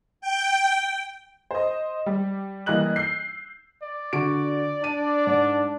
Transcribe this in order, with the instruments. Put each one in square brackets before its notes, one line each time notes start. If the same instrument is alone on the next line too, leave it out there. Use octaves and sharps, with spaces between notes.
[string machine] G5
[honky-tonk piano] C5 D#5
G3
E3 G3 A#3 D#5 F#6 F#7
E6 G6 C7
[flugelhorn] D5
[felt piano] D3 F#4 D7
[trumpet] D4 [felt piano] D#7
[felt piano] G#2 [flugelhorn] D5